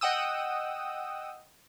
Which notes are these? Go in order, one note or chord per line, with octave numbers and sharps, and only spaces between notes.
D#5 F#5 G5 D#6 E6